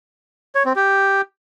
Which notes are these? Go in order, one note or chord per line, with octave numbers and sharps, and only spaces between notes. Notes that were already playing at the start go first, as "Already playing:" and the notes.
C#5
C4
G4